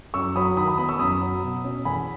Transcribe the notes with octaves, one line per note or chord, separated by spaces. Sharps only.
F#2 C#6 E6
F#3 B5 D#6
D#3 B5 D#6
B5 D#6
B3 B5 D#6
C#6 E6
F#2 B5 D#6
F#3
B2
C#4
E2 G#5 B5